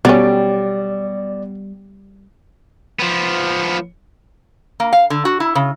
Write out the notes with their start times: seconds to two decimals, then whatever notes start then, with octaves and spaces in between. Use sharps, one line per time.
0.05 B2 F#3 G3 C#4 D5
2.99 F3 B3
4.80 A#3
4.93 F5
5.10 D3
5.25 F#4
5.40 E4
5.55 C#3